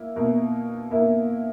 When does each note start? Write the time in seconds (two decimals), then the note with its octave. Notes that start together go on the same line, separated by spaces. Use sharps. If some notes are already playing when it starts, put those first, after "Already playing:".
Already playing: A#3 E4
0.16 B2 A#3 E4 A#4
0.90 B2 A#3 E4 A#4